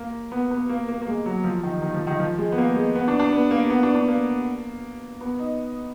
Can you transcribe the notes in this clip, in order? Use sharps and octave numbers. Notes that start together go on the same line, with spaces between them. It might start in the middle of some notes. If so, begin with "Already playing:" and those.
Already playing: A#3
B3
B3
A#3
A#3
A#3
G#3
F#3
F3
D#3
D#3
F3
D#3
F3
G#3
B3
A#3
G#3
B3
D4
D4
B3
A#3
B3
D4
D4
A#3
B3
D#4